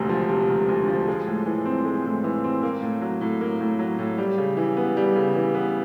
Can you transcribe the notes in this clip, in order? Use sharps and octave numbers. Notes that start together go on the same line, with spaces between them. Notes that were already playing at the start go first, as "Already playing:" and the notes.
Already playing: E1 D2 C3
F3
C3
E1
D2
F3
G#3
A2
E3
C4
G#3
A2
E3
C4
A#3
A2
F#3
A2
A#3
A2
F#3
A2
G3
C#3
E3
B3
G3
C#3
E3
B3